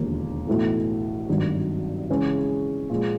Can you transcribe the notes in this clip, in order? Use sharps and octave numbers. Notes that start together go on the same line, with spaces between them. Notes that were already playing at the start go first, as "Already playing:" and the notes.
Already playing: E1 D#2 D3 F3 A#3
B1 A2 E3 A3
G#1 G2 D#3 F#3
C#3 E3 G#3 C#4
A#2 F3 G#3